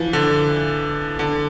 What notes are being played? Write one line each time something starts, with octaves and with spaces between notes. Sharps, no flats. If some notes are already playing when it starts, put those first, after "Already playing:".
Already playing: E3 F3
D3
D3